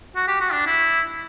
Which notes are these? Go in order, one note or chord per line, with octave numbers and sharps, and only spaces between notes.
F#4
G4
F#4
D4
E4